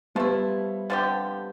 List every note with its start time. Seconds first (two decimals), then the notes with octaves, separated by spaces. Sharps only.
0.15 F3 G3 A3 B3 E4
0.90 D3 F3 C4 G4